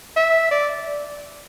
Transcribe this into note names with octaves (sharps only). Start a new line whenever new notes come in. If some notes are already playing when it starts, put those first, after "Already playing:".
E5
D5